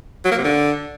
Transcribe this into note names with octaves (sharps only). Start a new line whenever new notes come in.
F#3
A#3
C3
D3